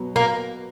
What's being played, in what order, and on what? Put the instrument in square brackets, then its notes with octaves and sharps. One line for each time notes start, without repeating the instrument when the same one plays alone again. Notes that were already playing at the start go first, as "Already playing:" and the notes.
Already playing: [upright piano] B2 F#3 B3
[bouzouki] A#3